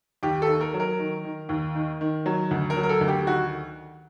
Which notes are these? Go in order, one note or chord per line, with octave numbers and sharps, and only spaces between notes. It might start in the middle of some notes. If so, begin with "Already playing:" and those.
D#2 G4
A4
D#3
A#4
F#3
A#4
D#3
D#3
D#2
D#3
D#3
F#3
D2
A#4
F#3
A#4
A4
D2
G4
D#3 F#4